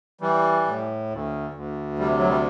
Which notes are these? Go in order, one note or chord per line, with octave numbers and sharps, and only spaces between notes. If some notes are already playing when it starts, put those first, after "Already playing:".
E3 G3
A2
D2
D2
C3 G3
F#3
G3